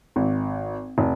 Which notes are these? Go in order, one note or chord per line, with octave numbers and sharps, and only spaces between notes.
G#1
F1